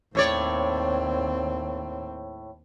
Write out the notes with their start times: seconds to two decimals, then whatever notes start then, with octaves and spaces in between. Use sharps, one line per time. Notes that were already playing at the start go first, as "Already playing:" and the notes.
0.15 D#2 A2 C4 C#5 D5